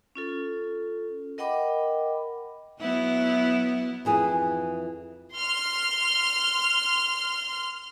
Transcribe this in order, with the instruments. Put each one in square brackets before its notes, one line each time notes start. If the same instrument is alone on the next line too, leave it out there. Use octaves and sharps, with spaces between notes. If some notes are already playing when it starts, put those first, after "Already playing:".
[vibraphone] C#4 F4 A4
A#4 D#5 F#5 G5 B5 D6
[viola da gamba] F#3 B3 E4
[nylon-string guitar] F2 E3 G#4
[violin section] C6 F6